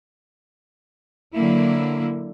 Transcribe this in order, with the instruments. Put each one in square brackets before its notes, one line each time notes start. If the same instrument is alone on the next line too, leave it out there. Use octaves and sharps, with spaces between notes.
[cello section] D3 F#3 A#3 E4